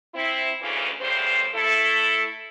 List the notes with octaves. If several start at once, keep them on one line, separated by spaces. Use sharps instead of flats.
C4 E4
D2 C#3 E3
E2 A2 C#3 G3 C5
A3 E4 A4